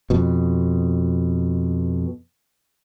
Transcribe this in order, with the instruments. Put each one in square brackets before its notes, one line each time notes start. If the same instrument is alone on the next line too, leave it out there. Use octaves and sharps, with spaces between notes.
[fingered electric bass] F2 B2